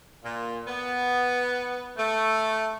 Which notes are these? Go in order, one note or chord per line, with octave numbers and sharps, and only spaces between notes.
A#2
B3
A3